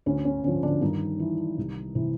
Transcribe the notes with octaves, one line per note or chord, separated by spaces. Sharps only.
D2 C#4
C#4
D3 F3 C#4
D3 D4
G2 D#3 D#4
E3
C2
C3 E3